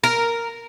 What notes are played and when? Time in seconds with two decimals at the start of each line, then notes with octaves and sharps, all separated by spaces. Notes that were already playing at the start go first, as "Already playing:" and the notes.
0.04 A#4